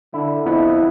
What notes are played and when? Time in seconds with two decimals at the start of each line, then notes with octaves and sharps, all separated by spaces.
0.14 D3 E4
0.46 F2 B3 E4